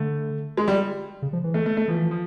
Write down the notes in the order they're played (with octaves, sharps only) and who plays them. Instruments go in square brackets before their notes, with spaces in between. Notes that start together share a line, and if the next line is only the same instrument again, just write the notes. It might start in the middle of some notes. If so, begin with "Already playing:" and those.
Already playing: [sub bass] D3 [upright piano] A3
[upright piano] G#3
G3
[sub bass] C#3
F3
E3
[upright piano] A3
A3
A3
[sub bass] E3 [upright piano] F3
[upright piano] F3